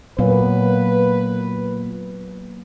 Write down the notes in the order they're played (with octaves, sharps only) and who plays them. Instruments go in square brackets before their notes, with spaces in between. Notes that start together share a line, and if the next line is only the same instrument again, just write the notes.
[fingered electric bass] A#2 [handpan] F#3 A#3 B3 [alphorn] B4